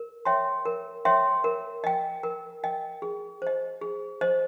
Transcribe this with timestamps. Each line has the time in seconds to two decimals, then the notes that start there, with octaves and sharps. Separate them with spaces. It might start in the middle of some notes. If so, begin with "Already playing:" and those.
Already playing: A#4
0.25 C#5 E5 G5 C6
0.65 A#4
1.05 C#5 E5 G5 C6
1.44 A#4
1.84 D#5 G5
2.23 A#4
2.64 D#5 G5
3.02 G#4
3.42 C5 D#5
3.81 G#4
4.21 C5 D#5